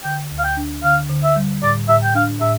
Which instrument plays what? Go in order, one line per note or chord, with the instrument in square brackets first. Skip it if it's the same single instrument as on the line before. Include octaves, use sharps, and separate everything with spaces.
[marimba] D3 [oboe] G5
[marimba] D2
[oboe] F5
G5
[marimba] D4
[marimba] D3 [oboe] F5
[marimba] D3
[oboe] E5
[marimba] G3
[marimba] A2 [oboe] D5
[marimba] A2 [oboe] E5
[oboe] G5
[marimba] D4 [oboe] F5
[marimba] A2 [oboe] E5